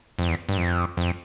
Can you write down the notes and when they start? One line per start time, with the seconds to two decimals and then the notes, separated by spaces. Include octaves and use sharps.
0.19 F2
0.28 E2
0.49 G2
0.57 F2
0.97 F2